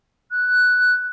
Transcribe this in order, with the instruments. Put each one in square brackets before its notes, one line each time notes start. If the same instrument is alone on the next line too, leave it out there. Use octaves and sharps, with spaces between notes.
[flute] F#6